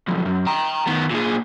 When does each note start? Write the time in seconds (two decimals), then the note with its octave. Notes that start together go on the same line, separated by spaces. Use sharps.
0.08 B1 F2
0.25 F#2
0.46 G5 A#5
0.87 D#3 B3
1.11 A#2 G#4